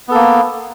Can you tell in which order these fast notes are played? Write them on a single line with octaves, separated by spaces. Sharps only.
B3 A4 A#3